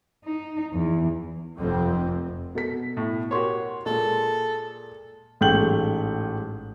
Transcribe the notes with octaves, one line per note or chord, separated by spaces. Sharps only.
D#4
E2
F1 F2 C4
B2 A4 B6
A2
F#4 G4 A#4 C#5 C6
A#2 G#3 A4
A1 G#2 A3 G5 G6 F#7